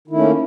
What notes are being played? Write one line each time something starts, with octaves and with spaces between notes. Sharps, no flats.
D#3 A3 A#3 C#4 E4